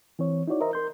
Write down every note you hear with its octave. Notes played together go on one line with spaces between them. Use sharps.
E3 C4 C#5
D#4 E4 F#4 C#5 D5
A#4 C5 D#5 E5 A#5
A#4 C6 G6